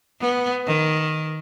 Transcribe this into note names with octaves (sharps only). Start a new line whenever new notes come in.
B3
D#3